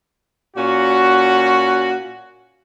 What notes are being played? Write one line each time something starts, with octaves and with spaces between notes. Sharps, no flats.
A#2 C#4 F#4